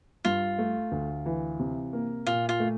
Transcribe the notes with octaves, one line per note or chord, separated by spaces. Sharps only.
G2 F4
A3
D2
E3
C3
A#3
A#2 F4
F4
A3